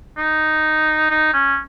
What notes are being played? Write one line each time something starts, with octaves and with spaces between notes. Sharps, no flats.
D#4
D#4
C#4